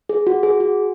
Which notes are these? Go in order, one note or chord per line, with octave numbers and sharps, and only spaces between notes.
G#4
F#4
G#4
F#4